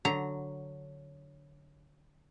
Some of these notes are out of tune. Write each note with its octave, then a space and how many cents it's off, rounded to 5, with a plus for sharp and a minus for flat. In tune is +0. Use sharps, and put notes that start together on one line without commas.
D3 +0 F#3 +0 A#5 +0